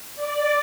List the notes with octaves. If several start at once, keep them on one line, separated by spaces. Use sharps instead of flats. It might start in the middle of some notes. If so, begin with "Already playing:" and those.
D5